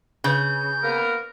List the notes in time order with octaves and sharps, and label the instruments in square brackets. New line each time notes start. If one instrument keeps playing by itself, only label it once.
[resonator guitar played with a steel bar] C#3 [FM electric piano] C#4 B4 [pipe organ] G6
[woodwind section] A#3 B3 A#4